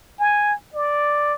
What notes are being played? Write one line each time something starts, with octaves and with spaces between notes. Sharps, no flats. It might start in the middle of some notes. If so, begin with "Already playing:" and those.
G#5
D5